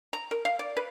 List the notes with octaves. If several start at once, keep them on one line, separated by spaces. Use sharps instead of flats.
A#5
A#4
F5
D5
B4